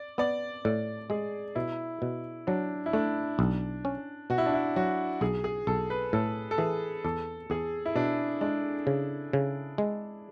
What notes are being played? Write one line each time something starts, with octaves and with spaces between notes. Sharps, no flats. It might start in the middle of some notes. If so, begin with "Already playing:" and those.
Already playing: D5
B3 D5
A2 D5
G#3 G#4
B2 E4
B2
F#3 D4
E4
A3 D4
B1
C#4
B2 F#4
E4
D4
E4
F#3 F#4
B1 G#4
G#4
B1 A4
B4
A2 A4
A4
E3 G#4
E2 A4
E2 G#4
E4
B2 D4
G#3 D4
C#3
C#3
G#3